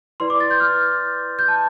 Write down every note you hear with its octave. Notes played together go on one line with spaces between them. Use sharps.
E4 B4 D5 C6
D6
A6
G6
F6
G6
A5